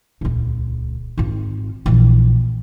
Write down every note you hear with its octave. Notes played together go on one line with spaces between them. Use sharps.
D#1 C#2
G#1 F4
A#1 E3